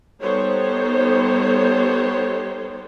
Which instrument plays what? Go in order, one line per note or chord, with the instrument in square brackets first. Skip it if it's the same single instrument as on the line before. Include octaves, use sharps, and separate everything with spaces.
[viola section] G3 B3 D#4 A4 C5 C#5